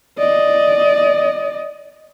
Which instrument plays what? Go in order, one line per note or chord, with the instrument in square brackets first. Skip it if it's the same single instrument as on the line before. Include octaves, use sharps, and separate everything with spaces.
[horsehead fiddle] D5 D#5